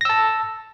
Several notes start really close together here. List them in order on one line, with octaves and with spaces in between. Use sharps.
A#6 E6 A5